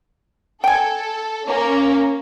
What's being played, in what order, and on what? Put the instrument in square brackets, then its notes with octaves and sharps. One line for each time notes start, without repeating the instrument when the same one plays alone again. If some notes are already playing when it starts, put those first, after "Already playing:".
[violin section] A4 [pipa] G5 G#5
[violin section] A#3 C#4